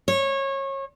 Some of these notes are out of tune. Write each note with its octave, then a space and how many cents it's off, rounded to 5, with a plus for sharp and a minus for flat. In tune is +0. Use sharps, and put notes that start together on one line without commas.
C#5 -25